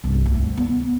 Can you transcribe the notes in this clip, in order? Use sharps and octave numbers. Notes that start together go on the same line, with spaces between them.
C2 G2
D2
B3